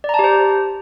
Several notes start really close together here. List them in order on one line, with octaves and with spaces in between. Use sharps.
D5 A#5 A5 G4 C5